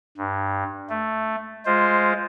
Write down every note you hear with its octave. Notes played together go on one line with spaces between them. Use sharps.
G2
A3
G#3 F4 C5